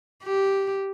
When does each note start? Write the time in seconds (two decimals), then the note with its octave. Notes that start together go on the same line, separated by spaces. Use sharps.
0.24 G4